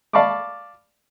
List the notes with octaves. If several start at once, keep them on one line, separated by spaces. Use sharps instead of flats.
D5 F5 A5 B5 C#6 D6